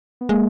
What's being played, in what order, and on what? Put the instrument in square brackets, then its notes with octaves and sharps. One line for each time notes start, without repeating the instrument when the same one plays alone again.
[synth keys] B3
[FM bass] G#3 [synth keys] A#3